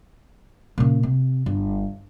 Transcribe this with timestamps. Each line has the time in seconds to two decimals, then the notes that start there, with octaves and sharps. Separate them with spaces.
0.78 A#2 C#3
1.03 C3
1.46 G1